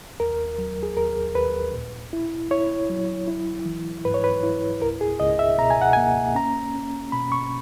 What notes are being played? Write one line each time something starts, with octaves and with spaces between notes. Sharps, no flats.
D#2 A#4
F#3
G#4
D#2 A#4
D#2 B4
A#2
E4
E4 C#5
F#3
E4
E3
G#2 B4
C#5
B4
E4
C#2 A#4
G#4
C#2 D#5
E5
B2 A#5
G#5
F#5
A#3 G#5
C#4 A#5
C#4
B2 B5
C#6